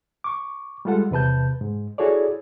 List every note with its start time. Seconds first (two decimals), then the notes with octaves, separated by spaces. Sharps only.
0.24 C#6 D6
0.85 G3 G#3 F4 A4 F#5
1.11 E2 C3 B4 A5 G6
1.61 G#2
1.98 E4 F#4 G#4 A4 C#5 D5